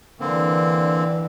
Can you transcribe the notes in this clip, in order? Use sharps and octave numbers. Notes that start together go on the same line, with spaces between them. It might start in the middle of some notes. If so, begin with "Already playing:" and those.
D3 E3 A#3 C4 D4